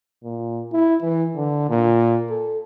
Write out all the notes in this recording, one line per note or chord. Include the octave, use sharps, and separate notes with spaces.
A#2
E4
E3
D3
A#2
A4